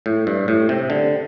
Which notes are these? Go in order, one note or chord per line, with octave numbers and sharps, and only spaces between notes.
A2
G2
A2
C3
D3